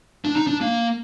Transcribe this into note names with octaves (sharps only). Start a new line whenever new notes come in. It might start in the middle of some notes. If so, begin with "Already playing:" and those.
D4
D#4
D4
A#3